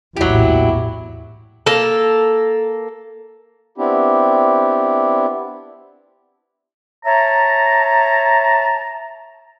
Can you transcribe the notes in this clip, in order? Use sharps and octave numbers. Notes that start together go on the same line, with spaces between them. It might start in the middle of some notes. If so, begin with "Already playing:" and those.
A#1 E2 A2 F#3 E4 G4
A#3 A4
B3 C4 D4 E4 G4
C#5 E5 A5 A#5